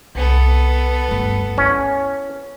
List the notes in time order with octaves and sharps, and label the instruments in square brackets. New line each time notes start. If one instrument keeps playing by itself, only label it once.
[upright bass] C2 [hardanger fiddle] B3 A4
[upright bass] D1 G1
[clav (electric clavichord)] C#4 [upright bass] E4